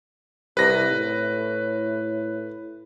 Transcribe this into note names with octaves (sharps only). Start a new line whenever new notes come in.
C2 B4 A#6
A2